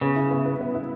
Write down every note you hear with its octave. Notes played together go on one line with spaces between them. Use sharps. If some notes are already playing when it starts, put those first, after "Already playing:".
C#3 B3
E4
B3
B4
B3
E4